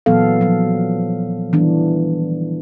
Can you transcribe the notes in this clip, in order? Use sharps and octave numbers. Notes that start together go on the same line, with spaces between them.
A#2 E3 F#3 B3 A4 F5
F3 F#3
D#3 E3 F#3 G3 B3 D4